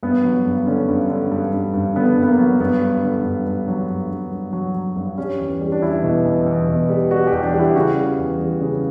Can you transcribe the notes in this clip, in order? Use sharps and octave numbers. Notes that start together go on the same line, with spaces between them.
G2 B3
F#3
G2
D3 C#4
G2
D3
G2
G2
G2
D3 B3
G2
B3
A#3
F#3
G2 B3
G2
D3
G2
G2
F#3
G2
G2
G2
F#3
F#3
G2
G3 C#4
E2
G3
D4
E2 E4
B2
E2
E2
B2
G3
G3 F#4
G4
E2
D4
G3
E4
C#3 F#4
G3
E2
G3
C#3